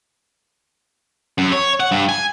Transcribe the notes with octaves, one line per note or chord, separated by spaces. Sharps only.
F#2
C#5
F#5
G2
G#5